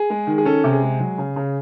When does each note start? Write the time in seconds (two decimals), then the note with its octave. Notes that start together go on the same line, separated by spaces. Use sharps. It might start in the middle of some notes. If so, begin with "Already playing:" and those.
Already playing: G#4
0.10 G#3
0.27 D#3
0.38 G#4
0.45 C#4 A4
0.64 C3
0.73 G#4
0.82 G#3
1.00 F#3
1.18 C#3
1.36 C#3